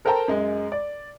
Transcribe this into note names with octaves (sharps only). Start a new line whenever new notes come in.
A4 A#4 C5 G5 A5 A#5
F#2 G#3
D5